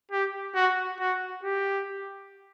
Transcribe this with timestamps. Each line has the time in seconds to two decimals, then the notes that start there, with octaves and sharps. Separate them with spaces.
0.11 G4
0.55 F#4
1.00 F#4
1.44 G4